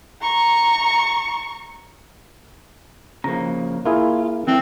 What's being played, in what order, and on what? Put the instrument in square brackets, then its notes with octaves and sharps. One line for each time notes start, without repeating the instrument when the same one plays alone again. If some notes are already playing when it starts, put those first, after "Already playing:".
[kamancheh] A#5 C#6
[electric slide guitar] C#3 F3 A#3 [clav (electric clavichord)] A#5
[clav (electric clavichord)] A#3 E4 G#4 [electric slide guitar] F4
[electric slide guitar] E3 F#3 A3 [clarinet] C4